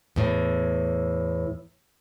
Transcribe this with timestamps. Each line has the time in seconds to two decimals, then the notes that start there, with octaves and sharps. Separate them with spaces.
0.16 E2 A2